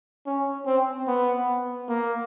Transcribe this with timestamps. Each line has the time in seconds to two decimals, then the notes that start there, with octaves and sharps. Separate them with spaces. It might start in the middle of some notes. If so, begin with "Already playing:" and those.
0.27 C#4
0.66 C4
1.08 B3
1.89 A#3